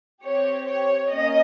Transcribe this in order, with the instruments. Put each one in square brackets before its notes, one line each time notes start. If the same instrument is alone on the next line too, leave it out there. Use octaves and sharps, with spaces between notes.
[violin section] C4 G4 C#5
C#5
A#3 C#4 D#5